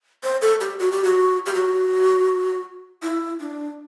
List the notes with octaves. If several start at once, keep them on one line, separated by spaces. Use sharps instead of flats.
C5
A4
G4
F#4
G4
F#4
G4
F#4
E4
D4